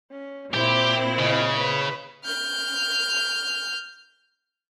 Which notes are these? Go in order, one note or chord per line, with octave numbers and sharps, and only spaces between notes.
C#4
A#2 C4 E4 G4 C5
C#3 D#5
B4
F6 G6